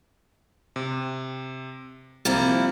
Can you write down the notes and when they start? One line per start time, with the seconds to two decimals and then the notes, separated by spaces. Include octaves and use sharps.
0.76 C3
2.25 C2 F3 G3 A#3 E4